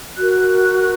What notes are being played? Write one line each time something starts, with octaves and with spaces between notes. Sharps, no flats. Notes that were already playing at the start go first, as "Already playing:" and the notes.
F#4 A#4 F#6